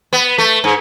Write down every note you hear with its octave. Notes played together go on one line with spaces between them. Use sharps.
B3
A3
G#2